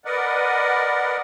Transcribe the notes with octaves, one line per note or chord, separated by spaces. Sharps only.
A#4 B4 D5 D#5 F#5